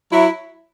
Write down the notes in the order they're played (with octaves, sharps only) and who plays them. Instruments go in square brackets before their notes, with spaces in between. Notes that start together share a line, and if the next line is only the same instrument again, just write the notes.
[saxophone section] F#3 E4